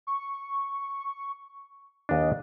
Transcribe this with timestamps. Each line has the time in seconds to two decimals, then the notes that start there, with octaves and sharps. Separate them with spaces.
0.07 C#6
2.09 D#2 D4 D#5